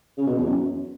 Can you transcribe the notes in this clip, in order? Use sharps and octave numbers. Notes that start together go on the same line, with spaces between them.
C#3
B2
E2
F#2